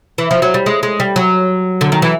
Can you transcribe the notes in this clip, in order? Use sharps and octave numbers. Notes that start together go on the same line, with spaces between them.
E3
F3
F#3
G3
G#3
G#3
G3
F#3
D3
D#3
E3